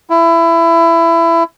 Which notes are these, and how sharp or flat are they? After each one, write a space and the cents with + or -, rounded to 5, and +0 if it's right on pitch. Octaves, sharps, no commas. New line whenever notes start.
E4 +20